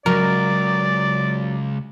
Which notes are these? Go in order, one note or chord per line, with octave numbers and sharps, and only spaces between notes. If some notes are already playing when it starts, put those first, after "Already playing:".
C#2 F#3 A#4 D5